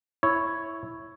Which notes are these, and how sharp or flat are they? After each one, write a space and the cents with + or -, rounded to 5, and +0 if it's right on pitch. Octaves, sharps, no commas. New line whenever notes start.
E4 +0 C#5 +0